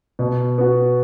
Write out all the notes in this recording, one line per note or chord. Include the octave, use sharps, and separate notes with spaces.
B2
B3 F#4